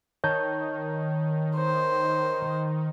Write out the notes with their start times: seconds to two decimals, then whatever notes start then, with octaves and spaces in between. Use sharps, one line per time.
0.24 D#3 C#5 A5 G6
1.56 C5